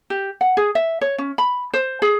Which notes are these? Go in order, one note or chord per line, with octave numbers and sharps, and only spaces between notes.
G4
F#5
G#4
E5
C#5
C#4
B5
C5
G#4